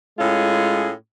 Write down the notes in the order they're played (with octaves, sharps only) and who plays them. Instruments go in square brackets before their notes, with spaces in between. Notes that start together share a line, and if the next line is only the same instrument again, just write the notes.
[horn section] A2 G#3 C#4 F4 G#4